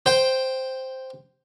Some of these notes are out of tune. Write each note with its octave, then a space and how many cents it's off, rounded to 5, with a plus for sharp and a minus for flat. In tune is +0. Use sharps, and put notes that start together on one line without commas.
C5 +0 G5 +0